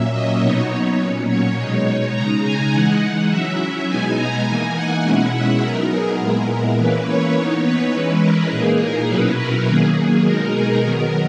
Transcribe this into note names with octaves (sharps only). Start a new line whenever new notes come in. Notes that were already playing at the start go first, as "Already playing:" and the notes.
Already playing: A#2 F#3 A#3 C#4 E5
D#5
B2 F#3 B3 D#4 C#5
A#2 F#3 C#4
C#5
B2 G#3 D#4 C#5
C#3 G#3 D#4 A#5
G#5
E3 G#3 D#4 F#5
F#5
F#3 C#4 E4 E5
B2 G#3 B3 D#4 G#5
A#5
E3 A#3 D#4 G#5
F#5
B2 G#3 C#4 E4 F#5
E5
F#3 B3 D#4 A#4
G#4
A#2 G#3 B3 E4 A#4
E3 A#3 C#4 E4 B4
C#5
E3 B3 D#4 C#5
B4
E3 G#3 C#4 E4 B4
A#4
A#2 A#3 D#4 G#4
A#4
B2 F#3 C#4 E4 B4
A#4
D#3 F#3 A#3 G#4
B2 G#3 D#4 A#4
G#4
D#3 F#3 B3 A#4